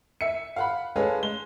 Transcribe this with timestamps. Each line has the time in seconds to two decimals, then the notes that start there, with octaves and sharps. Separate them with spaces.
0.21 E5 C#7
0.56 F5 F#5 B5
0.96 G#3 C#4 G#4 A4 B4 F5
1.23 G#3 G7